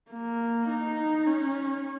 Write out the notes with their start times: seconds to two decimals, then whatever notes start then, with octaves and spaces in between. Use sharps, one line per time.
0.11 A#3
0.69 D#4
1.27 C#4